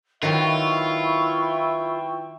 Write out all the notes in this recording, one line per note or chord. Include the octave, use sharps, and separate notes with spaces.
D#3 F#3 E4 F4 B4 E5 G5 C#6